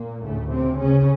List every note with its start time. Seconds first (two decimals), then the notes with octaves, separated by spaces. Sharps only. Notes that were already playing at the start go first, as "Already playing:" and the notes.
Already playing: A#2 A#3
0.24 D2 A2 C#3 A3
0.52 C3 C4
0.80 C#3 C#4